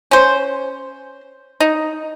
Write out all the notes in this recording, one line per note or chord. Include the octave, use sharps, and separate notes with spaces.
C#4 C5
D#4